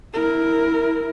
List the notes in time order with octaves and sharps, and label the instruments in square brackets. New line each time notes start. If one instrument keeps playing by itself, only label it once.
[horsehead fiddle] E4 A#4